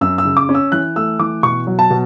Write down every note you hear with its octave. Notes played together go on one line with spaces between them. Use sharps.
F#2 E6
E6
C#3
D6
C#4
E6
E3 F#6
A3 E6
E3 D6
B2 C#6
F#3
A5
B2